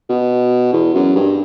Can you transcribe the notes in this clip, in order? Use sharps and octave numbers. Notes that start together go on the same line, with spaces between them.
B2
E2
F#2
G2